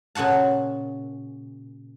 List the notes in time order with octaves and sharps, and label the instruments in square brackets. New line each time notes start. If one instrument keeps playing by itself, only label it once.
[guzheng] A#2 C#3 F#4 F#5 A5